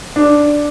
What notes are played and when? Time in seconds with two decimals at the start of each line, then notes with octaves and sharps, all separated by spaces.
0.16 D4